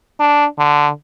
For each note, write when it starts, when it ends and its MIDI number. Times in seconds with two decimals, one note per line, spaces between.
0.20 0.46 62
0.58 0.90 50